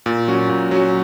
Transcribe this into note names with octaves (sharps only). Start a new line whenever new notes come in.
A#2
F#3 C#4 F#4
A#2
F#3 C#4 F#4